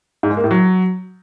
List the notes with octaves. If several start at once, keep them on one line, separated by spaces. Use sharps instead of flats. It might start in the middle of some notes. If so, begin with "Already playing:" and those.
G#2
G#3
A#3
A2
F#3